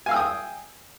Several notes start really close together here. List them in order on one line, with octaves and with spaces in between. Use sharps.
G#5 F5 E6 G5 D#6